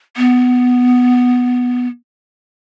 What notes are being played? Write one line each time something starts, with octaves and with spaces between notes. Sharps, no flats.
B3